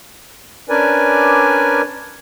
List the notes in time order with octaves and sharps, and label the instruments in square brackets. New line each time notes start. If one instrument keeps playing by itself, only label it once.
[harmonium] C#4 D4 A#4 B4 D5 G#5